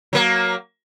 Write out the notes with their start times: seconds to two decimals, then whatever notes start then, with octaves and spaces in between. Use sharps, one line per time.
0.13 F#3 A#3